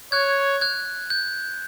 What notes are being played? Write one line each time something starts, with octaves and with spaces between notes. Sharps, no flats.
C#5 F#6 G#6
F#6 G#6
G6